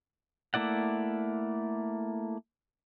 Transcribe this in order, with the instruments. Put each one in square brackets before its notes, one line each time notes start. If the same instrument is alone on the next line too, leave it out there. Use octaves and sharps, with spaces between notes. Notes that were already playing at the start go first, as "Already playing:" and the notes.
[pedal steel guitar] A3 A#3 E4 D5 F#5